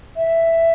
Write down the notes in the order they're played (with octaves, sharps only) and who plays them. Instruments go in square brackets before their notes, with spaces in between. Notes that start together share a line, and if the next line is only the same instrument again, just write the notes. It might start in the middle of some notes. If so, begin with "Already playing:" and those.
[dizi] E5